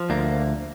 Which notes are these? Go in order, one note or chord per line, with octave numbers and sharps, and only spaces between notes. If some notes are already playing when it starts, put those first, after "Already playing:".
Already playing: F3
D2 A#3